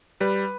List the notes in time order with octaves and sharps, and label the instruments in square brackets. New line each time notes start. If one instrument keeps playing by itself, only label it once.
[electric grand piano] G3 [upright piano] B4